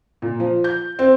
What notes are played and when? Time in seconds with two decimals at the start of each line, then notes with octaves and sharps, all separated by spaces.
0.22 A#2
0.40 F3
0.64 G6
0.99 C4